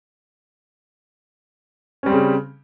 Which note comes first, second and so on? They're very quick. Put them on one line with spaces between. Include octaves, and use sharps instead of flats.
C#4 G3 C4 C#3